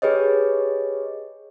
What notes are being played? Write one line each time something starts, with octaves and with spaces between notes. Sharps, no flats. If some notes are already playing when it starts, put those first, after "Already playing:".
G4 G#4 B4 C#5 D#5